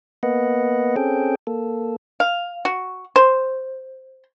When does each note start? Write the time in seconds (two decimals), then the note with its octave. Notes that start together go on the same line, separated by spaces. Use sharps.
0.23 A#3 B3 B4 D#5 F#5
0.96 C4 C#4 G#4 A4 G5
1.47 A#3 A4
2.20 F5
2.65 F#4
3.16 C5